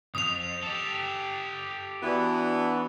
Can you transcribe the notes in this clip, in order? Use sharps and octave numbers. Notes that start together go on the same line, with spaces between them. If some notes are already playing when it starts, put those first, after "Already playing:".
B1 F2 D#6 F7
G4 A4
E3 B3 D4 F#4